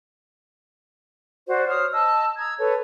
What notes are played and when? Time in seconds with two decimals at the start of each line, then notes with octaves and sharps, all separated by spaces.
1.47 F#4 C5 D5
1.67 C5 C#5 D#6 F6
1.92 D#5 A5 E6
2.37 A#5 D#6 E6 G#6
2.59 A4 B4 C#5